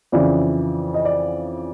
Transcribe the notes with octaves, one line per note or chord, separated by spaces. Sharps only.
F2 C#3 E3 D5
D#5
D5